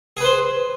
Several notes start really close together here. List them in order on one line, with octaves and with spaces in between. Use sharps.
G#4 B4 C5